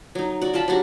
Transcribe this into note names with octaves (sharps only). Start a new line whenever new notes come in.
F#3 D#4
F#4 D5
F4 F5 A5 B5
F#3 D4 F#4 G4